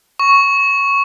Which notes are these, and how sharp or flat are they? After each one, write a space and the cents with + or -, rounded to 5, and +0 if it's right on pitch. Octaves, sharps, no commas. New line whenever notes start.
C#6 +0